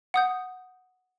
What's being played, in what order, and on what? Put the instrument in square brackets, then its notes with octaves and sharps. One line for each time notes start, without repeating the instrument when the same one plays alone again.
[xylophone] F#5 D#6 G6